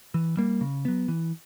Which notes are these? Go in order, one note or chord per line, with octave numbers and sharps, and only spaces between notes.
E3
G3 A#3
C#3
F#3 B3
E3